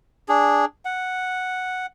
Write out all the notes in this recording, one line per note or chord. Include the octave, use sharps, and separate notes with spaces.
D4 G#4
F#5